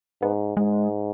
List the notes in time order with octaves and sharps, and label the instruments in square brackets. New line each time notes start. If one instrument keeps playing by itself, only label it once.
[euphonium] G#2 [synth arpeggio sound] B3
[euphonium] G#2 [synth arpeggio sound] G#3